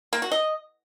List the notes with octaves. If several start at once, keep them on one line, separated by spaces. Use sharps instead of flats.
A#3
F#4
D#5